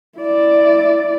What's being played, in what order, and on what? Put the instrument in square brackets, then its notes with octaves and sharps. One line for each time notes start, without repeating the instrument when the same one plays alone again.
[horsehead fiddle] E4 D5